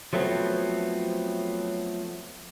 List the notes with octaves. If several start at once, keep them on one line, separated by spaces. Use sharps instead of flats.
F3 F#3 A3 B3 C4